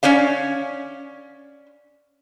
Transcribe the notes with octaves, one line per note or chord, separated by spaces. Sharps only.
C#4 C#5 D5 F5